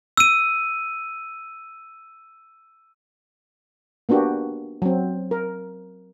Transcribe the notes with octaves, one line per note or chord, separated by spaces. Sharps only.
E6 D#7
A#3 B3 D4 F#4 G4
F#3 C4
A#4